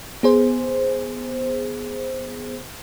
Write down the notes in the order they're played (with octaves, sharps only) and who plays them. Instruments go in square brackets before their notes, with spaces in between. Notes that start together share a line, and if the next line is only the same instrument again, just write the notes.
[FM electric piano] B3 G#4 C5